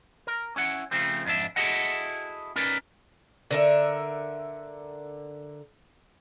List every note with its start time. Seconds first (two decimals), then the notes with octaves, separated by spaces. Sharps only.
0.27 A#4
0.56 C#4 E4 F#5
0.91 C#3 F3 A3 C4
1.25 F2 G#2 D4 E5
1.56 E4 F#4 G#4 A4 D#5 F#5
2.56 C#4 D#4 A#4 B4 D5
3.51 D3 A#4 E5